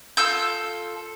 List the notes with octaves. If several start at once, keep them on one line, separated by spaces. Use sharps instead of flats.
F4 A4 E6 G6